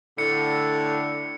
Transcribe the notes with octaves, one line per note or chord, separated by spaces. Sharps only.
A2 D3 C#7